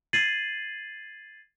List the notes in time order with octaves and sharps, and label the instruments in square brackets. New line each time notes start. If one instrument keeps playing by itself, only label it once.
[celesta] G#6 A6 C7 D#7 F#7